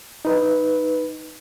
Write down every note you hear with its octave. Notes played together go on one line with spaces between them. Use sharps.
D#4 B4